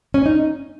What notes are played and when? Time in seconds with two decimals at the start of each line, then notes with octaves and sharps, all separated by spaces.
0.14 C#4
0.26 D#4